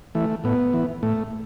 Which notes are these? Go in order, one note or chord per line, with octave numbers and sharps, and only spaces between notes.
E3 A3
A2 B3
E3
A2 A3